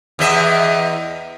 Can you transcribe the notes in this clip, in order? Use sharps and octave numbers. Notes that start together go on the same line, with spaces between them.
E2 D#5 E5